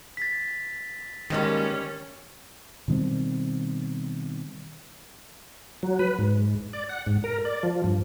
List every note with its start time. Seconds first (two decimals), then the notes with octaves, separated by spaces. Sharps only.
0.17 A6 B6
1.30 D#3 G3 G#3 A#3 C#4 B4
2.88 B2 D#3 G3 C4
5.83 F#3
5.99 B4
6.19 G#2
6.73 D5
6.89 F#5
7.06 G#2
7.24 A#4
7.45 D5
7.63 F3
7.84 G2